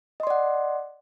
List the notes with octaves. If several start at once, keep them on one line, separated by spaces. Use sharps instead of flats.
D5 D#5 F#5 C6